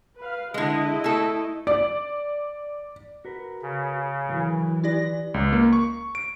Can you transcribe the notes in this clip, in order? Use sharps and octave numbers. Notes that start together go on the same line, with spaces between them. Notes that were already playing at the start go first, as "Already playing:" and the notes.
B4 F5
D3 G#3 E4 D#5
A3 A4
D5
F#4 A#4 B4
C#3
E3 F#3 A#4
E4 G4 D5 A#6
C#2
A#3
C#6
D7